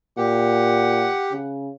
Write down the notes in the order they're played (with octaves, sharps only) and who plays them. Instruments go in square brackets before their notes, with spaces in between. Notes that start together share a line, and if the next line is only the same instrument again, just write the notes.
[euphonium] A#2 [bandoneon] G4 [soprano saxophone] F#5
[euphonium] C#3